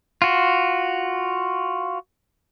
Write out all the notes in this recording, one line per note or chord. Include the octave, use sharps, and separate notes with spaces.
F4 F#4